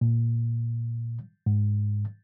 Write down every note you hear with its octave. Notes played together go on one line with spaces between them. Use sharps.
A#2
G#2